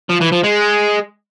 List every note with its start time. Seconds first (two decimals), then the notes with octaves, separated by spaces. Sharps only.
0.10 F3
0.21 E3
0.33 F3
0.44 G#3